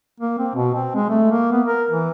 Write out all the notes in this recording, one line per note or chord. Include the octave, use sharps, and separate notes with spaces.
A#3
C4
B2
C4
G#3
A3
A#3
B3
A#4
E3